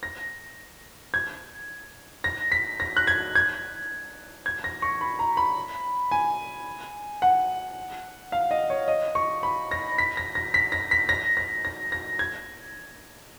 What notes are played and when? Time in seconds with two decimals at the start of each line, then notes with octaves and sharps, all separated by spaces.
0.03 A#6
1.14 G#6
2.24 A#6
2.52 B6
2.80 A#6
2.97 F#6
3.07 G#6
3.35 G#6
4.46 G#6
4.64 A#6
4.82 C#6
5.01 B5
5.19 A#5
5.37 B5
6.11 G#5
7.22 F#5
8.32 F5
8.51 D#5
8.70 C#5
8.88 D#5
9.15 C#6
9.43 B5
9.71 A#6
9.98 B6
10.17 A#6
10.35 A#6
10.54 B6
10.72 A#6
10.91 B6
11.09 A#6
11.37 A#6
11.65 A#6
11.92 A#6
12.19 G#6